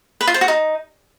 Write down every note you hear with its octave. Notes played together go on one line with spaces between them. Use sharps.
B4
F4
C5
F#4
D#4